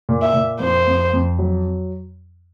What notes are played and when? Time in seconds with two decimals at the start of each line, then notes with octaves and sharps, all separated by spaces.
0.09 A#2
0.22 E5
0.34 A#2
0.60 F2 C5
0.87 F2
1.13 F2
1.39 F#3